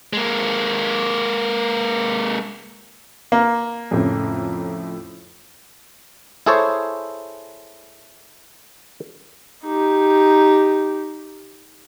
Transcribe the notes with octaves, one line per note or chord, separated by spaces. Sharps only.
G#3 A#3
A#3
F2 A2 C#3
E4 G#4 A4 C5 C#5
D#4 G4